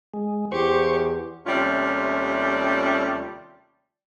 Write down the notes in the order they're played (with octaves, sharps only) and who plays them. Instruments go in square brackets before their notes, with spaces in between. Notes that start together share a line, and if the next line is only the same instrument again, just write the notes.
[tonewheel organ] G#3
[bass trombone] E2 [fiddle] G4 [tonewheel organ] C5 C#6
[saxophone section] D#2 C3 G3 A3 C#4 F4